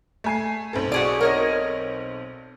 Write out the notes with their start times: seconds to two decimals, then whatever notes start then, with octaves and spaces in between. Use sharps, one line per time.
0.24 A3 G#5 C7
0.73 B1 C4 A4
0.92 F#4 G#4 D5
1.21 A#4 C#5 D#5